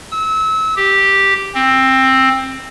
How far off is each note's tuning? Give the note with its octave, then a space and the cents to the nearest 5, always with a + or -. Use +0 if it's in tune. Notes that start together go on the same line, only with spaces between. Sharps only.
E6 -30
G4 +0
C4 +15